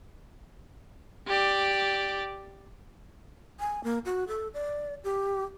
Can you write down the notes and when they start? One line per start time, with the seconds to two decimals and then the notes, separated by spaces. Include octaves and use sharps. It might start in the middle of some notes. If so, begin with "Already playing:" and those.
1.27 G4 D5
3.60 G#5
3.84 A#3
4.05 F#4
4.28 A4
4.54 D5
5.04 G4